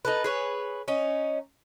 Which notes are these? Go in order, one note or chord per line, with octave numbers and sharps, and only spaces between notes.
D#4 A4 B4
G#4 B4 C#5
C#4 D#4